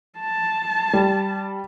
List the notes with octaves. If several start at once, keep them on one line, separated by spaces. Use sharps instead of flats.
A5
G3